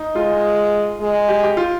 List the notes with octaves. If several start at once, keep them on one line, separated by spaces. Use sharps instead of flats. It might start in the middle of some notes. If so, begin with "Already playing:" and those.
Already playing: D#4
G#3 F4
G#3
G4
G4
F4